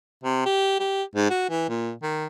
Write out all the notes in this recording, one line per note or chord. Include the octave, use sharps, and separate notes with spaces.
C3
G4
G4
G#2
F#4
E3
A#2
D#3